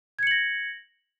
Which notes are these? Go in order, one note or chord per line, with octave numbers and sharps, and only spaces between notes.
G#6 A#6 C#7 F#7